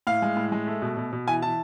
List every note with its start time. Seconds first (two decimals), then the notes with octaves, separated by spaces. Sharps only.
0.07 A2 F5
0.22 G#3
0.37 A2
0.52 G#3
0.67 A3
0.82 B2
0.97 B2
1.13 B2
1.27 E3 G#5
1.42 E3 A5